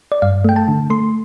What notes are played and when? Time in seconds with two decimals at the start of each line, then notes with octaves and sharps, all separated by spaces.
0.12 D5
0.22 G2 F5
0.45 A3 G5
0.56 A5
0.68 D3
0.90 A3 C6